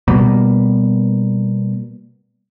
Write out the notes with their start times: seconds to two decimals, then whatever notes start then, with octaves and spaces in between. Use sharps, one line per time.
0.08 B2 G3 A#3 B3